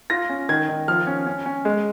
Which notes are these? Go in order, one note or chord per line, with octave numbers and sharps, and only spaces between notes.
F4 A#6
C#4
D#3 G#6
D#3
F3 F6
C#4
C#4
C#4
G#3